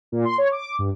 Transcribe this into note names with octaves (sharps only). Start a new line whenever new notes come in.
A#2
C6
C#5
D6
G2